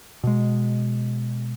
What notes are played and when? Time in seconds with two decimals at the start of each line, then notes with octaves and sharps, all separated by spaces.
0.24 B2 G#3